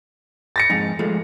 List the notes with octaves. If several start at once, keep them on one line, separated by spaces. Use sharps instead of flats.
A6 A#6 C#7
F2 G#2 D#4
F3 G#3 A3